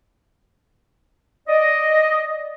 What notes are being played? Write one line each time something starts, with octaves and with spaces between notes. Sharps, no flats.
D5 D#5